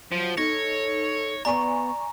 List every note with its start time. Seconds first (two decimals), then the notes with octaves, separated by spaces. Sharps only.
0.12 F3 F#3
0.38 D#4 A4 C#5 A#6
1.45 B3 D5 G#5 A#5 C#6